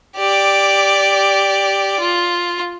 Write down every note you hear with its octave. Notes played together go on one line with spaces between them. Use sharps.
G4 D5
F4